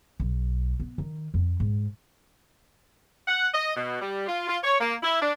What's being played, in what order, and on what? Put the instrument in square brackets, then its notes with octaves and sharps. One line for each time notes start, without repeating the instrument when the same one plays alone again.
[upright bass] B1
B3
D#3
F2
G#2
[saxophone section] F#5
D#5
B2
G3
F4
F4
C#5
A#3
E4
D4